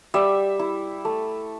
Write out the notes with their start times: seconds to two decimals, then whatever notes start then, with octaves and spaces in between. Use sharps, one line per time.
0.14 G3 E5
0.59 E4
1.05 A3